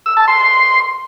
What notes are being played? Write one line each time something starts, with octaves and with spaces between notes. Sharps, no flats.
E6
A5
C6